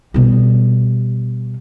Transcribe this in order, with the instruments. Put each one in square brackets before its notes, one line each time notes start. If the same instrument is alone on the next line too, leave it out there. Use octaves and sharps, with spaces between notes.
[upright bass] B2 G3